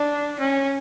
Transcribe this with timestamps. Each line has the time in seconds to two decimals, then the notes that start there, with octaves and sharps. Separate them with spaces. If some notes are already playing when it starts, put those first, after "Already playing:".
Already playing: D4
0.39 C#4